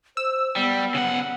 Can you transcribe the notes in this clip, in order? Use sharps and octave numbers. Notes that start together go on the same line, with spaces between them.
C5 E6
G3 B3
C#3 F#5